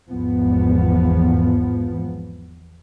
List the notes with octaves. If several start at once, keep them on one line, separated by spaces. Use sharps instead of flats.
G#1 E2 F3 B3